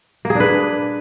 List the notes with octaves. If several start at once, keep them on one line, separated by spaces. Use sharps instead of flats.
A#3
G#4
D4
B4